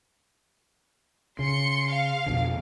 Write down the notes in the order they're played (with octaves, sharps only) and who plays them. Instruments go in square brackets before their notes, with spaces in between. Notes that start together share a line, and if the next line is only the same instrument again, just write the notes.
[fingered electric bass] C#3 [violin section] C6 C#7
[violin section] F5
[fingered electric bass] F2 B2 D3